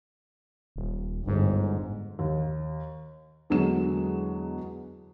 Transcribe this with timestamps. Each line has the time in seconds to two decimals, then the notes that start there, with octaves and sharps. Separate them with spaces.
0.76 D#1
1.27 G1 G#2
2.19 D#2
3.50 E2 D3 F#3 G#3 E7